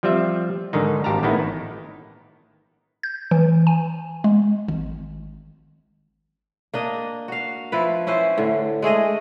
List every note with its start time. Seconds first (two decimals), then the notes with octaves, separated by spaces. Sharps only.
0.03 F3 G3 C4 F4 E5
0.73 G#2 D3 D#3 D#4
1.04 G#1 G4 F5 A5 A#5
1.23 A1 D#3 B3 D#4 E4
3.03 G6
3.31 E3
3.67 G#5
4.24 G#3
4.68 G#1
6.74 A#3 D4 D#5
7.28 F#4 F5
7.72 F3 E4 B4
8.07 C#4 E4 B4 C5
8.38 A2 D3
8.82 G#3 A3 G#4 D#5